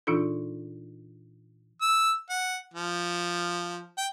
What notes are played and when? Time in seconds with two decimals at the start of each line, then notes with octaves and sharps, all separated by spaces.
0.07 A#2 E3 D4 D#4 F4 A4
1.82 E6
2.30 F#5
2.74 F3
3.98 G5